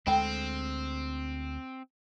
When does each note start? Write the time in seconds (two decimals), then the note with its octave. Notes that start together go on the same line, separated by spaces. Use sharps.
0.07 D2 G#3 C4 A4 G5 B5